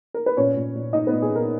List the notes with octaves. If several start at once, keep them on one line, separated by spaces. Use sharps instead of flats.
A#4
B4
A#2 C#4 C#5
A#2
A#2
A#2 D#4 D#5
B3 B4
A#2
G#4
A#2 A#4